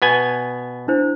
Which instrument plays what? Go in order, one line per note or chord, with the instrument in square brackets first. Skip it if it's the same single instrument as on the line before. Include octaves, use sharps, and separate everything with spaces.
[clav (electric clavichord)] B2 B3 G#5
[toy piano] D4 E4 C5